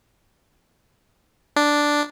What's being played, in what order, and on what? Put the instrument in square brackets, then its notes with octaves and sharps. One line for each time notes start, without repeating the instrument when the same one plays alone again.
[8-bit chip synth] D4